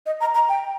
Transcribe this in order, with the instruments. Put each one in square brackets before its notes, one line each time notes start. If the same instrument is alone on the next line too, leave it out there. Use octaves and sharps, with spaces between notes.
[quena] D#5
A#5
A#5
G5